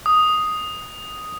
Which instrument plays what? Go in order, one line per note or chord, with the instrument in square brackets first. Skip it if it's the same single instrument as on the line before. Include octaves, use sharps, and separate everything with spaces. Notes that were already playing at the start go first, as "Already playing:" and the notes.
[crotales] D#6